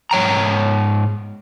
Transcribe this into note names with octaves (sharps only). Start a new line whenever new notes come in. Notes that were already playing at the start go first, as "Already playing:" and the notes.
G#2 C#5 G5 A#5